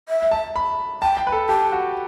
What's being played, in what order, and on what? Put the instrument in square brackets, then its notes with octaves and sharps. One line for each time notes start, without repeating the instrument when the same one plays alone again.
[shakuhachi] E5
[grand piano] A5
B5
[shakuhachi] G5 [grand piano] A5
[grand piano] G5
B4
A4
[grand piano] G4 [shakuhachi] A5
[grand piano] F#4